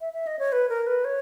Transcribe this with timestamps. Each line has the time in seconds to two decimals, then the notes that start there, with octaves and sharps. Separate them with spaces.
0.01 E5
0.13 E5
0.27 D#5
0.39 C#5
0.52 B4
0.69 A#4
0.87 B4
1.05 C#5